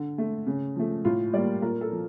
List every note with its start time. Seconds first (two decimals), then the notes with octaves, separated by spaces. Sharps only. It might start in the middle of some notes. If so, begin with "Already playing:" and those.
Already playing: D3
0.18 A3
0.46 C#3
0.76 F3 A3
1.05 A2 F4
1.33 G3 A#3 D5
1.62 A#2 A#4
1.81 A4
1.92 F3